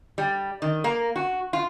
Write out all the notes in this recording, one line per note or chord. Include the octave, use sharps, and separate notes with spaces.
G3
D#3
A#3
F#4
F4